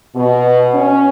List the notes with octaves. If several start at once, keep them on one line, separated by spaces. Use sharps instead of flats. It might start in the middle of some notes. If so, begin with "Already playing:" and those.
B2
C#4